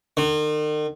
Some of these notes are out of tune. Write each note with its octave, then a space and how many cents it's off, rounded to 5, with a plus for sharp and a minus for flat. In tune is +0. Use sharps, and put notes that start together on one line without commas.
D#3 -45